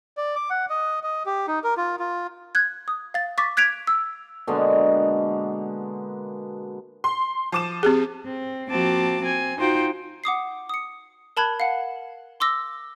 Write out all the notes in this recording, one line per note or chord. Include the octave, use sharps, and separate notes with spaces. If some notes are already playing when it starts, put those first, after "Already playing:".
D5
D6
F#5
D#5
D#5
G4
D#4
A#4
F4
F4
F#6 G#6
D#6
F5 A6
C#6 D6 A6 B6
F#6 G#6 B6 D7 F7
E6
B2 D3 G#3 A#3
C6
F3 D6 E7
C4 G4 G#4
C4
F3 A#3 C4 F#4 A5 D6
C4 G#5
D#4 F4 F#4 C5 G5
F#5 D6 D#6 C7
D#6 C#7
A#4 A5 B5 F#6 G#6
F5 F#5
C6 D6 E6 A#6